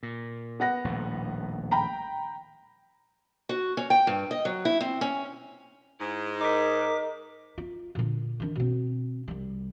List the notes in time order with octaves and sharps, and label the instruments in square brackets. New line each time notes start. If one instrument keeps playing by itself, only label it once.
[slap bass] A#2
[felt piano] B3 F#5 A#6
[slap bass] D#1 A#1 A2
[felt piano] G5 A#5 B5
[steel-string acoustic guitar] F#4
C#4
G5
G2
D#5
F#3
E4
C4
C#4
[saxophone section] G#2 [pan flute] E4
[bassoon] D#4 [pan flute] A#4 [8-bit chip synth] D6 B6
[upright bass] F4
A#2 D3
D#3 D4
B2 C4
C2 G3